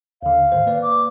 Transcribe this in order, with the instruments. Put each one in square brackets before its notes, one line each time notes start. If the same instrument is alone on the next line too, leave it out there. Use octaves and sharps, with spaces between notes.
[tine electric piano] D#2 D3 [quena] F5
[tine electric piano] G#2 D#3 C5
A#3 B4 D5
[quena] D6